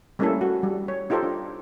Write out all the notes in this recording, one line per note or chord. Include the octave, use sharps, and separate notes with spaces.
G3 A3 A#3 C#4 E4 A4
F#4
G3
C#5
D#4 F4 G4 A4 C5
D4